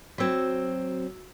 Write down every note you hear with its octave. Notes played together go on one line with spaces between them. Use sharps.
F#3 C4 F#4 E6 G#6